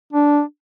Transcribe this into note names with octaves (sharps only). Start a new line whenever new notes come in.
D4